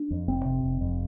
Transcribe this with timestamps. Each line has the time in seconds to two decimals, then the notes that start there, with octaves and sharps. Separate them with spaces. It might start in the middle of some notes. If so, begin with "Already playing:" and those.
Already playing: D4
0.11 F2
0.28 F1 C4
0.45 C3
0.64 F1
0.81 F2